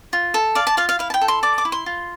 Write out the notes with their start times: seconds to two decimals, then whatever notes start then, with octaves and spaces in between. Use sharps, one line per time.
0.13 F4
0.34 A4
0.55 D5 F5
0.67 A5
0.77 F4 F5
0.89 F5
0.99 E4 F5
1.10 A5
1.14 G5
1.21 A4
1.28 C6
1.43 D5 D6
1.58 D6
1.65 E4
1.72 C6
1.86 F4